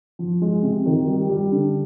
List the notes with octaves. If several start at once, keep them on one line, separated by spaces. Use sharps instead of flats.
F3
G#3
C3
D#3
G3
G3
D3